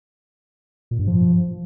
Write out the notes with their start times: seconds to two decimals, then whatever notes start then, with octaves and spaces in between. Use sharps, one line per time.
0.91 A#2
0.99 G2
1.07 F3